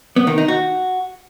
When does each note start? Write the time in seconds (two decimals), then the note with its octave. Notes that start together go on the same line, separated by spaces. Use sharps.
0.16 B3
0.27 D#3
0.38 D#4
0.48 F#4